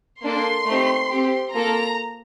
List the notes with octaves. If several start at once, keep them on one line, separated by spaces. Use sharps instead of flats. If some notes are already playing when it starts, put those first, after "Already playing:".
A#3 D4 A4 C6
A3 C4 D#4 G4
C4 G4
A#3 F4 A4 A#5